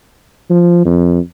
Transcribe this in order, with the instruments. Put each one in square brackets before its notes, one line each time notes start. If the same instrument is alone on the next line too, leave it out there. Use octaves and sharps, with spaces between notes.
[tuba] F3
F2